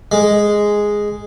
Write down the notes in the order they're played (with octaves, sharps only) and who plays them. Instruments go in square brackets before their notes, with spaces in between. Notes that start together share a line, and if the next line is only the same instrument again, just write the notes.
[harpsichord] G#3